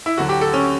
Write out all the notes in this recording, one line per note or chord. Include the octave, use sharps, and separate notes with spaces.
E4
D2 D3 F#3 F#4
G4
A4
C#4